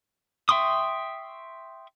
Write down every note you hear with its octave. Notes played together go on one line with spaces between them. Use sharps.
E5 G5 C6 C#6 D#6